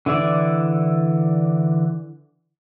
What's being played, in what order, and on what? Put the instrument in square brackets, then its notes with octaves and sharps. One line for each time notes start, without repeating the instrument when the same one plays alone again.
[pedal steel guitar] D3 E3 E4 D5